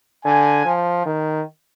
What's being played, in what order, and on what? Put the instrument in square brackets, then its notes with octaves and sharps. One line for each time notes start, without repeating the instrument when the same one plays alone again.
[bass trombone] D3 [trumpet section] G#5
[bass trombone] F3
D#3